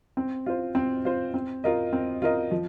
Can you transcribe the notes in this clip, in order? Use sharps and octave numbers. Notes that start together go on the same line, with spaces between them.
C4
F4 C5
C4
F4 C5
C4
F4 A#4 D#5
C4
F4 A#4 D#5
F3